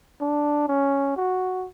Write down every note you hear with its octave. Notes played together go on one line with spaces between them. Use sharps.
D4
C#4
F#4